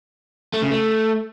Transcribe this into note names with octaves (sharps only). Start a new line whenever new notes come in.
A3
C#3
A3